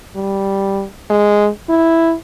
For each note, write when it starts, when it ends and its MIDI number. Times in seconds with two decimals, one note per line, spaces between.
0.16 0.84 55
1.10 1.49 56
1.69 2.13 64